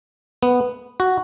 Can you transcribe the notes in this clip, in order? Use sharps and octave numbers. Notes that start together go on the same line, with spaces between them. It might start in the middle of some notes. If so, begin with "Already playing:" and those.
B3
F#4